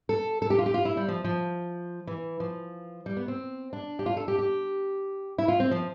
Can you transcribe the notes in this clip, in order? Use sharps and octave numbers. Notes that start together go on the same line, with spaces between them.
A4
A4
G4
F4
G4
F4
E4
G3
F3
F3
E3
F3
G3
B3
C4
D4
G4
F4
A4
G4
G4
E4
F4
C4
F3